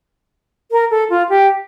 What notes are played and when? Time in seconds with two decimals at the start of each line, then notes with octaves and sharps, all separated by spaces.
0.72 A#4
0.91 A4
1.10 F4
1.29 G4